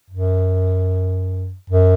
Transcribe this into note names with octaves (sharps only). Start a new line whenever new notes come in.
F#2
F#2